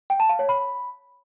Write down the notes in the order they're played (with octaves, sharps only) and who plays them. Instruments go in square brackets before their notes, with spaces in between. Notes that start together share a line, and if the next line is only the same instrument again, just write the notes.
[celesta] G5
A5
F5
C#5
B5